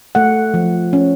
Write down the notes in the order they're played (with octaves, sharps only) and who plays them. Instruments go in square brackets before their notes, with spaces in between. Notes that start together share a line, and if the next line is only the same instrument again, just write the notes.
[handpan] A3 F#5
F3
C#4